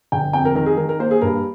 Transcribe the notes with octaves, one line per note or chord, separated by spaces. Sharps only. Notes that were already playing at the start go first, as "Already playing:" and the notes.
G1 G5
F2 G5
A#4
D#3 A#4
G#4
D#3 A#4
A#4
A#3 C5
G#4
G2 A#4